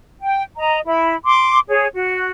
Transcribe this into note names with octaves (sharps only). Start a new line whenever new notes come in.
G5
D#5 A#5
E4 B5
C6 D6
G#4 C#5
F#4